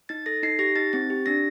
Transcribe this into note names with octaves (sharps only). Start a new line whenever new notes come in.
D#4 A6
A4 A#6
D#4 C7
G4 A#6
D#4 A6
C4 A6
G4
D4 A#6